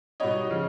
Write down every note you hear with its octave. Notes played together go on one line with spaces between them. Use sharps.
B2 G3 B3 D#4 C#5 D#5
C#3 F3